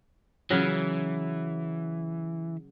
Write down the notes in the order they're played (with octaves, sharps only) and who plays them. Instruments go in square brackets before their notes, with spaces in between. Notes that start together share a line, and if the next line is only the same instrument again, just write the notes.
[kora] C#3 F#3 [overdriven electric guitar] E3